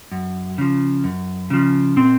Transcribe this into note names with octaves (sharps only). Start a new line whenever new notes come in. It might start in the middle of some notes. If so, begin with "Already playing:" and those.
F#2
C#3 F3
F#2
C#3 F3
A#2 C4